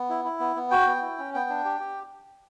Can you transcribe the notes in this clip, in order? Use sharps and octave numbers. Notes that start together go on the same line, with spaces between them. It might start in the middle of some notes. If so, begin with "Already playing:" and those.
Already playing: B3
E4
E4
B3
B3
F#4 G5
B3
E4
C#4
B3 G5
D4
G4
G4